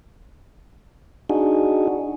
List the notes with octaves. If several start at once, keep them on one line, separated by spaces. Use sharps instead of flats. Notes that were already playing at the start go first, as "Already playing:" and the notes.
D4 D#4 F#4 G#4